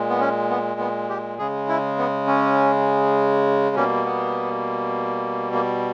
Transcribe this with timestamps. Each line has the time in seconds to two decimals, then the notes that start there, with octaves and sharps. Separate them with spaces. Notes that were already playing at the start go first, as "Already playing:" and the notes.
Already playing: A#2 G#3
0.10 B3
0.20 C#4
0.50 B3
0.80 B3
1.09 G4
1.39 C#3 G#3 G#4
1.69 E4
1.98 B3
2.27 C#4
3.75 B2 G3 A#3 C#4
4.05 B3
5.53 A#3